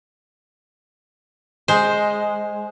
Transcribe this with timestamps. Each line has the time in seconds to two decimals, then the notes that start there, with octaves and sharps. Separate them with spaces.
1.68 G#3 C5